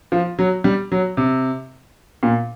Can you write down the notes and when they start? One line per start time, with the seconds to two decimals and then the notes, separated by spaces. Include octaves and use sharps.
0.12 F3
0.39 F#3
0.64 G3
0.92 F#3
1.17 C3
2.23 A#2